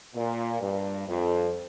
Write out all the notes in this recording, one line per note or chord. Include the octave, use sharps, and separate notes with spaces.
A#2
G2
F2